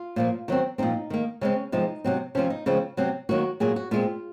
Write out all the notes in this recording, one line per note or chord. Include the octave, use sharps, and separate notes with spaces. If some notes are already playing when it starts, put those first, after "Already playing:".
Already playing: F4
A#2 F3 A#3
D#3 F#3 C4
A#2 F3 C4 D#4
D#3 A#3
C#3 G#3 C4 C#4
C3 F3 G#3 C4 D#4
C3 F#3 C4
C3 F3 C4 C#4
D#4
C#3 F3 G#3 C4
C3 F#3 C4
D#3 F#3 A#3 F#4
A#2 F#3 A#3 G#4
F#4
A#2 G#3 C4 F4